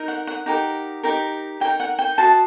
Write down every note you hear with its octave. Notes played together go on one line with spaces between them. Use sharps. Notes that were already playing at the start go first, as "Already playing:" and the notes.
Already playing: D#4 A#4
F#5
F#5
D#4 G4 A#4
D#4 G4 A#4
D#4 G4 A#4 G5
F#5
G5
F#4 C5 D#5 A5